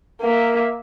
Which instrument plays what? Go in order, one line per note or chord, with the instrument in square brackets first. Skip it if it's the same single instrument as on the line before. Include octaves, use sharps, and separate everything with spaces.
[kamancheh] A#3 E5